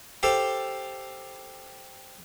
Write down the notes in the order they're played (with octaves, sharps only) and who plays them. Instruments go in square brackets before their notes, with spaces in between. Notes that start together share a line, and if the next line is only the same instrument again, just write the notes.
[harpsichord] G4 A4 C5 F5